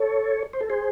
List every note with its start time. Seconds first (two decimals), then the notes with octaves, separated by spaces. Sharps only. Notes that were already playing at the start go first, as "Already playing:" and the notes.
Already playing: A4 C#5
0.53 C5
0.61 A4
0.70 G#4 C5